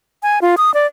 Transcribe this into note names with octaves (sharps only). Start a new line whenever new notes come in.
G#5
F4
D#6
D5